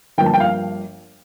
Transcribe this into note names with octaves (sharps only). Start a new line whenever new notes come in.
G1 G2 F3 A#3 G5
A5
G5
F5